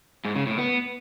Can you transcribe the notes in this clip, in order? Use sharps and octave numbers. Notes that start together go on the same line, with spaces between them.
G#2
C#3
A2
B3